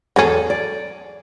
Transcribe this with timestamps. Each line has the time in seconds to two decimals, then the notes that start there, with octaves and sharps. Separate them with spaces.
0.16 E2 F#3 C#4 G#4 A4
0.50 D5